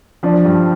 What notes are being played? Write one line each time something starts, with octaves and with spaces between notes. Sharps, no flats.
F3 D4
G2